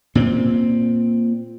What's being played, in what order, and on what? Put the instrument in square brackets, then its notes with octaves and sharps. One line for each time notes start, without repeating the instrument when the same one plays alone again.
[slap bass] A#2 C4